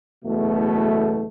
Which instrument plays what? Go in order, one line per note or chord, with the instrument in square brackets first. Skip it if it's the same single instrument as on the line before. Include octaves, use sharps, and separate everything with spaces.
[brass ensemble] F#1 E2 B2 A3